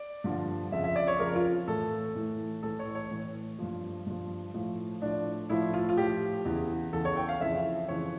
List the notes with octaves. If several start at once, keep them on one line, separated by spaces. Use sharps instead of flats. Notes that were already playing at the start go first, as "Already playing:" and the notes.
Already playing: D5
G2 D3 F3
F2 C#3 F3 E5
E5
D5
C#5
F2 C#3 F3 A#4
F4
A2 E3 A4
A2 E3
A2 E3 A4
C#5
C#5
A2 E3
G2 F3
G2 F3
A2 F3
A2 F3 D4
A2 F3 E4
F4
F4
A2 F3 G4
E2 C#3 E3
E2 C#3 E3 A4
C#5
G5
F5
F2 C#3 E3 E5
F2 C#3 E3 C#5